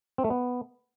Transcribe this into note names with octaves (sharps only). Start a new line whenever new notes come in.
C4
A3
B3